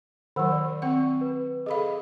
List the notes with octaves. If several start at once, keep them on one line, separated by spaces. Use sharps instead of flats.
D#3 F#3 C5 F#5 E6
D5
C4 F#5 C#6
B4
G#4 A4 D#5 F5 B5